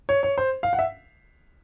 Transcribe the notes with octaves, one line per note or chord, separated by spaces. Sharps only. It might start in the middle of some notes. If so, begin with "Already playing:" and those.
C#5
C#5
C5
F5
F#5
E5